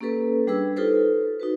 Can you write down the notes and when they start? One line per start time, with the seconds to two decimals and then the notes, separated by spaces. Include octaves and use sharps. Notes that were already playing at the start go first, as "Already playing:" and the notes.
0.01 A#3 C#4 G4 A4 B4
0.47 G3 D4 G#4 B4 E6
0.76 D#4 F4 G4 A4 B4 C5
1.40 D#4 F#4 B4